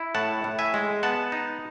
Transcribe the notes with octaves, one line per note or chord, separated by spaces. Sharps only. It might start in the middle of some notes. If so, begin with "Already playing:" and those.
Already playing: E4
A2 F#5 A5
A2
E5 G#5
G#3
B3 F#5 A5
D#4